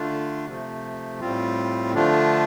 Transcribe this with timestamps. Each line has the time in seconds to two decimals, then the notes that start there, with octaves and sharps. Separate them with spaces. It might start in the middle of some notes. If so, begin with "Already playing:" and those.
Already playing: D3 A3 D4 F4
0.46 C3 F3 A3
1.20 A2 G3 C4 F4
1.94 D3 F3 A3 D4 F4